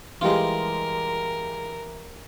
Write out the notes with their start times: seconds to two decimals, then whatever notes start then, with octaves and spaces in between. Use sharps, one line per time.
0.21 E3 G3 G#3 F4 G4 A#4